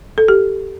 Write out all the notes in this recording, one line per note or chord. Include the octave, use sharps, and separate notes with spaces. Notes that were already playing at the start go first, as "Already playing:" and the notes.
A4
G4